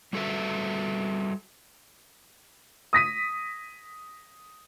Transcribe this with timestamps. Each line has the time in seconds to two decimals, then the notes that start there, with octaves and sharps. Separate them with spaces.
0.13 G3 F#4 A4 B4 E5
2.93 D#6 A#6 B6 D#7